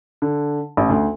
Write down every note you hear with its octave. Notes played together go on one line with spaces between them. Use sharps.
D3
A1
D2